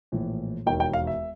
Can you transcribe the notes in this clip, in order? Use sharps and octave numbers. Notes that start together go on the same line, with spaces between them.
A#1 A2 E3
E1 D#2 D#3 G5
G5
F5
E5